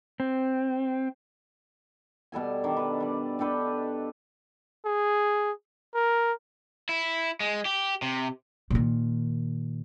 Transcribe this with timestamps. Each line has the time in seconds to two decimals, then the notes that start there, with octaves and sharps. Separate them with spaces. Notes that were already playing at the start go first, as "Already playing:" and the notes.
0.20 C4
2.32 B2 G3 A4 G#5
2.64 D#3 D4 A4
2.77 B4
3.00 G3 D5
3.39 D4 G4 A4 B4
4.85 G#4
5.94 A#4
6.89 E4
7.40 G#3
7.65 G4
8.02 C3
8.70 A#2 D#3